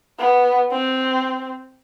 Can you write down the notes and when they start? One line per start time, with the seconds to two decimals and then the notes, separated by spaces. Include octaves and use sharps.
0.19 B3
0.72 C4